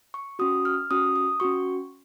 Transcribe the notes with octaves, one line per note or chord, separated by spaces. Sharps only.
C#6
C#4 F#4 D#6
F6
C#4 F#4 D#6
D#6
C#4 F#4 C#6